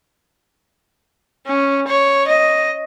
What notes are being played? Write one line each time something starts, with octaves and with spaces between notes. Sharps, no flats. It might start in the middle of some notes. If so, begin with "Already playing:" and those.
C#4
C#5
D#5